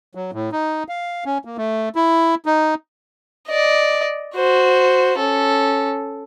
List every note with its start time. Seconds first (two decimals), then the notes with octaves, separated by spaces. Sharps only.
0.15 F#3
0.33 A2
0.52 D#4
0.89 F5
1.25 C#4
1.45 A#3
1.58 A3
1.96 E4
2.46 D#4
3.48 D5 D#5
4.35 F#4 C5
5.18 C#4 A4